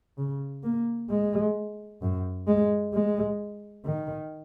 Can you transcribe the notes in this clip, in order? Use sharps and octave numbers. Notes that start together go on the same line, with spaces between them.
C#3
A#3
G#3
F#2
G#3
G#3
D#3